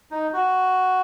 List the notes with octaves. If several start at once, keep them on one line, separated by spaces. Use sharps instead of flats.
D#4
F#4